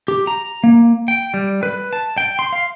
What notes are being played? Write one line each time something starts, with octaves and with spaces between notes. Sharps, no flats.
G4
A#5
A#3
G5
G3
B4
A5
G5
C6
F5